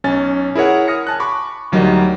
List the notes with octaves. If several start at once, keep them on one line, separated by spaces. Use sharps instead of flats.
B1 C#4 G#5 A6
E4 G#4 A#4 C#5 F#5
D#6 F6 A#6 C#7
G#5 A5 F#6
B5 C#6 D6
D2 F#3 G3 D#4 A#4 D#5